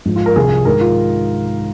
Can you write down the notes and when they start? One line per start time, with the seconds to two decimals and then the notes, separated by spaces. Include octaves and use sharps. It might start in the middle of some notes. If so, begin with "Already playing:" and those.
0.05 G#2 F3
0.16 F4
0.26 A#4
0.36 C2 C3 F3 G#4
0.65 G#2 D#3 A#4
0.81 F4